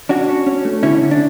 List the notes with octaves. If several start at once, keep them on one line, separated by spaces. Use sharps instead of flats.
C#4 D4 F#4
C#4
C#4
A3
D3 C#4 E4
D3
D4